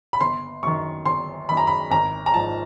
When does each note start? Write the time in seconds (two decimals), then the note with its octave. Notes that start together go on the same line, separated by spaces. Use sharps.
0.13 B5
0.20 G1 C6
0.63 F#2 D#3 C#6
1.05 G1 C6
1.49 F#2 D#3 B5
1.57 A#5
1.67 B5
1.91 G#1 A#5
2.26 A#5
2.34 G#2 F3 A5